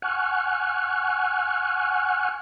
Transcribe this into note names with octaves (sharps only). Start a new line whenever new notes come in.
F#5 G#5 C#6 F6 F#6